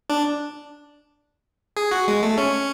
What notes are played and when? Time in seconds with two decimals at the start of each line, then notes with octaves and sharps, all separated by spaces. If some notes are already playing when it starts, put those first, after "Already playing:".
0.10 D4
1.77 G#4
1.91 F#4
2.08 G#3
2.23 A3
2.38 C#4